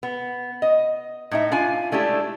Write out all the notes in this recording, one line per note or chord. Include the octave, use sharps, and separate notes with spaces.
B3
D#5
A2 D#4 E5
D4 F4 F5 G#5
G#3 A3 D4 E4 G4